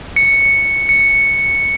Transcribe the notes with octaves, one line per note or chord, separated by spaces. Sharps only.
C#7
C#7